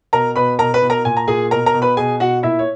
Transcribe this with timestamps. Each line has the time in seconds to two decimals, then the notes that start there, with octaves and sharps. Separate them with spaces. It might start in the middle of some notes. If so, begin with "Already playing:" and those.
0.13 B2 A#4 A#5
0.36 B2 B4 B5
0.59 B2 A#4 A#5
0.74 B4 B5
0.82 B2
0.90 A#4 A#5
1.05 A#2 G#5
1.17 A#5
1.28 A#2 G#4 G#5
1.51 B2 A#4 A#5
1.66 A#4 A#5
1.74 B2
1.82 B4 B5
1.97 B2 G#4 G#5
2.20 B2 F#4 F#5
2.43 A#2 E4 E5
2.59 C#5